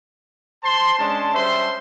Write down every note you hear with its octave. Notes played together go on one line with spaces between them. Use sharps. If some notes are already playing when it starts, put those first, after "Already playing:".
C5 A5 C6
G#3 C#4 D4 A5
G3 C#4 C5 E5 C6